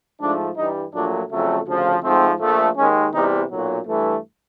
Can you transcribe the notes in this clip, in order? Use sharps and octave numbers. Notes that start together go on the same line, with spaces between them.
G#2 F3 A3 D4
G2 E3 G3 D#4
A#1 A#2 F#3 A3 D4
F2 C#3 F#3 A3
D2 C#3 F3
G#2 F3 A3 C4
A#1 A#2 F3 A3
D#2 D#3 G#3 C#4
E2 C3 E3 G3 D#4
B1 A#2 F#3
G2 E3 A3